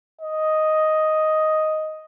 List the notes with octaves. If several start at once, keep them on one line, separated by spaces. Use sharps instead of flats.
D#5